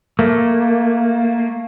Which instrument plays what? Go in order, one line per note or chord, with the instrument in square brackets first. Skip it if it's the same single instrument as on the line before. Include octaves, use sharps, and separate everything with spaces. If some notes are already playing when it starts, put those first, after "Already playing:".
[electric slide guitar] A3 A#3